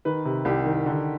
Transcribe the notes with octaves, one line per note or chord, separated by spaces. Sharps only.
D#3 B4
C3
C2 G4
D#3
D3